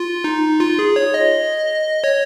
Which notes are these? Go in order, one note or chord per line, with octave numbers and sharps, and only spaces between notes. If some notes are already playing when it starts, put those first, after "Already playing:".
Already playing: F4
D#4
F4
G#4
C#5
D#5
C#5